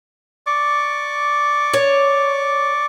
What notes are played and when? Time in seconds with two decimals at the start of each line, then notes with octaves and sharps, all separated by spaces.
0.47 D5 C#6 D6
1.74 C#5